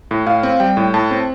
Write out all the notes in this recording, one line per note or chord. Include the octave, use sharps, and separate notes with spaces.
A2
A2 F5
C4
G3 G5
A2
A2 A5
C4